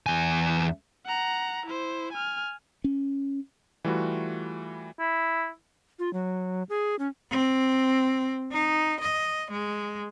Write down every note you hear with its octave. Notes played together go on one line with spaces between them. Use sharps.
E2 G#5
F#5 A#5
E4 C5
G#5 F6
C#4
E3 G3 A3 F4 F#4 B4
E4
F4
F#3
G#4
C#4
C4
D#4
D#5
G#3